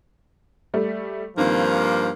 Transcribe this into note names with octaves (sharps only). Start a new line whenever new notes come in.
G3 A3
G2 D#3 F3 A#3 C4